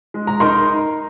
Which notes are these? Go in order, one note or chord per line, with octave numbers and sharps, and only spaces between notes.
G#3
A#5
D#4 A#4 C6